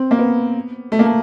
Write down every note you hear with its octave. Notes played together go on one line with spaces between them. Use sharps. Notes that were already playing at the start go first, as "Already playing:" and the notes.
Already playing: C4
A#3
B3
A3
A#3
A3